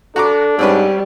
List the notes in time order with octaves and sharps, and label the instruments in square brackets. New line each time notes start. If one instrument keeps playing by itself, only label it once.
[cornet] D4 [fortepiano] F#4 A#5 D6 [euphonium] A4
[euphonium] G#2 [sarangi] G3 [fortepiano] C4 C#4 B4